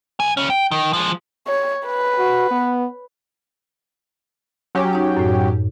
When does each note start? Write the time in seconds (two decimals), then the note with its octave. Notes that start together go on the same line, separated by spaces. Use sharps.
0.20 B1 G#5
0.37 D2 C#4
0.50 G5
0.71 D#3
0.93 F3 G#3
1.47 C#5
1.87 B4
2.19 F#4
2.51 B3
4.75 F#3 C#4 G4
4.93 D#4 C#5
5.17 F#2 A2